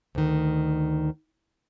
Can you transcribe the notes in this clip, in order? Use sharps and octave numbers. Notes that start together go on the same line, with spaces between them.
D2 D#3